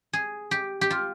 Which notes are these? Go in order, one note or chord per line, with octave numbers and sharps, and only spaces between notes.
G#4
G4
G4
F4